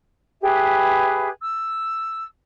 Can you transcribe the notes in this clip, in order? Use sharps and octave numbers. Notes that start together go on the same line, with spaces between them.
G4 G#4 B4 E5
E6